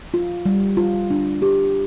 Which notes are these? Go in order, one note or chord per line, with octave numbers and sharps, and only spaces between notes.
F4
G3
F4
D4
G4